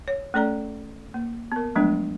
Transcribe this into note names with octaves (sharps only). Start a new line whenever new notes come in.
C#5
A3 C#4 A4 D5 A#5
A#3
B3 A#4
F3 F#3 G#3 A3 B3 D4